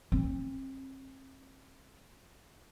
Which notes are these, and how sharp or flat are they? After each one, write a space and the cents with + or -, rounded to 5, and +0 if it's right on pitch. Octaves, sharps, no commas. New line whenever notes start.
C4 +40